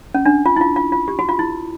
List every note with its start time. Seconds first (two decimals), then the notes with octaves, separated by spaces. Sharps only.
0.14 C#4
0.26 D4
0.46 F4
0.56 E4
0.61 F4
0.76 F4
0.92 F4
1.08 G4
1.19 F#4
1.29 F4
1.39 E4